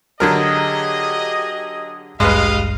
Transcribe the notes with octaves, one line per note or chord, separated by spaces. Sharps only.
D3 F#3 G4 G#4 A#4 D#5
A1 D2 G2 G3 G#3 B4 D#5 F5